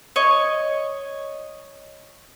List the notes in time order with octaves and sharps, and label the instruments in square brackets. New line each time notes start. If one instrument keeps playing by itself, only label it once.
[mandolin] C#5 D#5